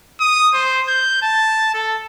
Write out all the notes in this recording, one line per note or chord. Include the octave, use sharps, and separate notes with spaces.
D#6
C5
G6
A5
A4